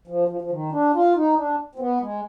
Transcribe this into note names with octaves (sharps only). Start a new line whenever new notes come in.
F3
F3
F3
D#3
D4
F4
D#4
D4
C4
B3
G#3